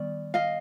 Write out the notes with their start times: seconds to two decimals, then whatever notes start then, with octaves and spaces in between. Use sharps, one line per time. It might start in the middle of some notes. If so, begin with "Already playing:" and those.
Already playing: D#3 G3 B3 D5
0.34 D#5 F5